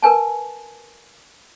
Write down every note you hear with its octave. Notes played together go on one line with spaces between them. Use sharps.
A#4 B4 G#5 A5